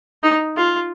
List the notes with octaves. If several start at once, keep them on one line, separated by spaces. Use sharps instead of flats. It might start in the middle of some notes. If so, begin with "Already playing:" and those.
D#4
F4